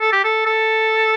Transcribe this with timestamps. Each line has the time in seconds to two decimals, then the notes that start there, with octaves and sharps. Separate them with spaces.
0.01 A4
0.13 G4
0.24 A4
0.46 A4